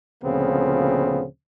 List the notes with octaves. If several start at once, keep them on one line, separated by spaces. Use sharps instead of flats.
D2 A#2 C#3 F3 B3 C4